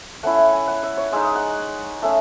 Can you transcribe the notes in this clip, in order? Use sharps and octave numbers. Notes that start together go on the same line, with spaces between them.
A3 C#4 E4 F#5
F#5
G#5
F#5
E5
C#5
G#3 D#4 E5
F#5
A3 C#4 E5